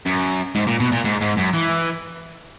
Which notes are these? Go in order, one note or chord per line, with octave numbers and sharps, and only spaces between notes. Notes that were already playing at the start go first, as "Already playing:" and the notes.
F#2
G#2
A#2
B2
A#2
G#2
G#2
F#2
E3